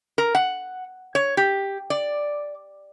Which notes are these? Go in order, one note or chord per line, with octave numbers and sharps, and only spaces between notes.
A#4
F#5
C#5
G4
D5